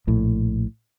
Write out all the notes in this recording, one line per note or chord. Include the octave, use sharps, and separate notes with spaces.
A#1 A2